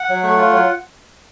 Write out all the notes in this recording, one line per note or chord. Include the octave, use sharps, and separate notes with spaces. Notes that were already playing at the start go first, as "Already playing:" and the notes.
Already playing: F#5
F#3
A3
F4
F#3